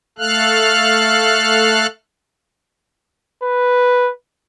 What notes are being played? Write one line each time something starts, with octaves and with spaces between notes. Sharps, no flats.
A3 A4 F5 F6 F#6
B4